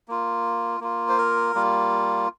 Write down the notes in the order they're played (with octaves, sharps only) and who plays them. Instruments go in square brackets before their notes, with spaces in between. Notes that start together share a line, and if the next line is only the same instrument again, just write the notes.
[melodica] A#3 F4
A#3 F4
C5
A#4
G3 A#3 F4